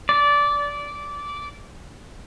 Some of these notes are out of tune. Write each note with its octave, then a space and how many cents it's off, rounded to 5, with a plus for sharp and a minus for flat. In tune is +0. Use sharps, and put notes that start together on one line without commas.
D5 -15